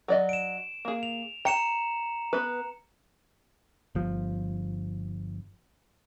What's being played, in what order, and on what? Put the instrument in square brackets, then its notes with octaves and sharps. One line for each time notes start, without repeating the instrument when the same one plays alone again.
[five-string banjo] F#3 D5 D#5
[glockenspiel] D7 E7
[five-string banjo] A#3 G#4
[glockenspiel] F7
[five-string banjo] G5 [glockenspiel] A#5 C#7 E7
[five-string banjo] B3 B4
[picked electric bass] G1 F3